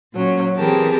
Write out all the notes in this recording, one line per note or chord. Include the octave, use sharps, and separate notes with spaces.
A#2 F#3 C#4
E3 C4 G4 G#4 A#4 A5